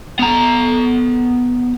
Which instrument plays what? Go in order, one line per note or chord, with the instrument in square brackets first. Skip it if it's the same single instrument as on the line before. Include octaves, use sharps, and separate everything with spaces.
[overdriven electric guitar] B3 A#5